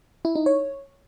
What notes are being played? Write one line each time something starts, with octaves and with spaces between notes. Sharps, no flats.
E4
D#4
C#5